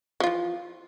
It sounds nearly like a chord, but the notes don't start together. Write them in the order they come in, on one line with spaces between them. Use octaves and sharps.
F3 F4 E3